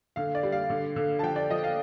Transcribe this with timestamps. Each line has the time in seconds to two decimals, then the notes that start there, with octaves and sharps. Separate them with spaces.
0.16 D3 F5
0.35 D5
0.43 G3
0.52 F5
0.70 D3
0.96 D3
1.19 A5
1.23 F3 G5
1.36 D5
1.50 F3 D#5
1.64 F5